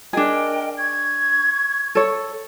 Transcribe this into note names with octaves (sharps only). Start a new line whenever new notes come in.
D4 G#4 A#4 D#5 G5
C#6 G#6
A4 C#5